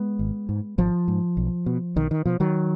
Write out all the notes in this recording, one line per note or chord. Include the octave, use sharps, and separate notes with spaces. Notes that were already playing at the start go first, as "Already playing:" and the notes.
Already playing: G#3 B3
G#1
G#2
G#1 F3
G#2
B1
B2
B1 D#3
D#3
B2 F3
D#3 F#3